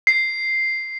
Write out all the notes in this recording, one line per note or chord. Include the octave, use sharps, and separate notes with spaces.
C7